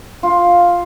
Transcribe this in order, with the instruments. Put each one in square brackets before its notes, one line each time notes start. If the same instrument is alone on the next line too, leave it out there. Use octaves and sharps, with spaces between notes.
[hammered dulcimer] F4